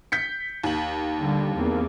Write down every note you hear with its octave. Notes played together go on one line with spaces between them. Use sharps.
G6 B6 C#7
D#2 F#7
D3 G3
E2 A#3 C4